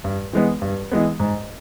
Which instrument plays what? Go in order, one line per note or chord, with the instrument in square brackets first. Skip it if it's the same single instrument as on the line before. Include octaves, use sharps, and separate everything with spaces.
[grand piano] G2
E3 G#3 B3
G2
E3 G#3 B3
G#2